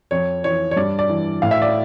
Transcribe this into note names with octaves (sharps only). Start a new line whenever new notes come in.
F2 C#5
E3 C#5
C#5
G2 D5
D5
E3
A2 F5
E5
D5